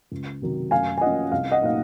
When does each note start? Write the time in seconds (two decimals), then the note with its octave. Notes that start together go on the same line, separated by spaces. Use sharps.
0.12 C#2
0.42 C3 D#3 F#3
0.71 F#2 F5 G#5
0.98 G#5
1.01 F3 A#3 C#4 D#5 F#5
1.32 C2 F5
1.52 D#5 F#5
1.62 A#2 F#3 A#3 D#4 F5